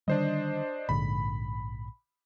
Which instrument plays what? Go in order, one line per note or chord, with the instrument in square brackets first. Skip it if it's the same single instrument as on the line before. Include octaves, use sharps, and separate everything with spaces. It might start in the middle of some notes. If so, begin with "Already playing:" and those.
[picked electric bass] D3 D#3 G3 [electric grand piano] D4 C5 D#5
[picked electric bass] A#1 G#2 D3 [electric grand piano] B5